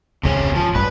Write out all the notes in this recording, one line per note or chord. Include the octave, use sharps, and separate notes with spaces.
E1 C#2 G#2 C3 C#4
F3
A1 G2 B4